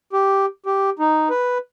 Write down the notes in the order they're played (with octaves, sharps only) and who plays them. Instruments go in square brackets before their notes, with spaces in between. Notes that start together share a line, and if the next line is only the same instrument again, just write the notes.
[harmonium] G4
G4
D#4
B4